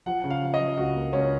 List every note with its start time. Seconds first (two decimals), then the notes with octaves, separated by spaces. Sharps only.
0.06 F3 F#5
0.24 C#3
0.30 F5
0.42 F3
0.54 D#5
0.60 F3
0.77 C#2 F#4
0.94 A#3
1.13 C#2 C#4